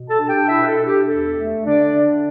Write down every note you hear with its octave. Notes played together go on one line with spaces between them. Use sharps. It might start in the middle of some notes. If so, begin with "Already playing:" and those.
Already playing: B2
A4 A5
D4
G4 G5
B2 E4 E5
B4
A4
D4
G4
E2 A4
A3
D3 D4 D5
D3